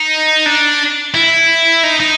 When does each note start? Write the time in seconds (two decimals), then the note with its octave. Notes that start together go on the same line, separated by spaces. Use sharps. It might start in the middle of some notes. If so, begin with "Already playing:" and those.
Already playing: D#4
0.46 D4
1.14 E4
1.83 D#4
2.00 D#4